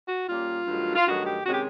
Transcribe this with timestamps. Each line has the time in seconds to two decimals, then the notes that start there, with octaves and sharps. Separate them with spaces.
0.08 F#4
0.28 A#2 G3 A#3 C#4 F4
0.67 G2 D#3 F#3 A3
0.96 F4
1.07 G2 D#3 F#3 A3 F#4
1.27 G4
1.46 C3 D#3 G#3 C#4 F#4
1.54 G4